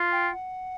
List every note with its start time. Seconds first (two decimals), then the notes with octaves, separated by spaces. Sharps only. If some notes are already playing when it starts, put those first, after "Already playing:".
Already playing: F4
0.12 G5
0.33 F#5